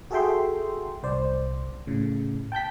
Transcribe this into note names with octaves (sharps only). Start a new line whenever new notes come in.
F#4 G#4 A4 E5 G5 C6
C2 C5 D5
A2 C#3
G5 A5 G6 B6